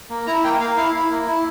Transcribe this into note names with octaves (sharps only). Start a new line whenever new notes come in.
A#3
E4 A#5
A#3 G5
A#3 F5
E4 F5
E4
A#3
E4